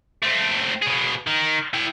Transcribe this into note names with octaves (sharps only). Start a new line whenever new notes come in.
A3 C4
B2 G#4
D#3
E4 G5